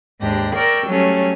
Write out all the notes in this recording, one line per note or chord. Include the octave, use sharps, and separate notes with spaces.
D#2 G#2 D4 G4 A#6
A#4 D5 G5 C#6 E6
F#3 G3 A3 C#4